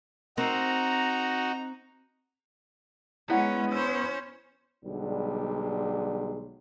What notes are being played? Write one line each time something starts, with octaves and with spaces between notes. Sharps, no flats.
C4 D#4 F#4 A#4 A#5
G#3 B3 C#4 E4 D5 F#5
C#4 C5 E6
B1 D3 G3 G#3